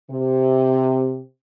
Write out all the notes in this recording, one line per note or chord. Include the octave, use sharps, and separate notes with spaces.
C3